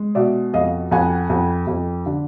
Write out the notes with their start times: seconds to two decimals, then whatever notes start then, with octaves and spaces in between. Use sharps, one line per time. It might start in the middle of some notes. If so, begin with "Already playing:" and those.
Already playing: G#3
0.15 B2 D5 E5
0.54 F2 D#5 F5
0.91 F2 F#5 G#5
1.30 F2
1.67 F2
2.06 D3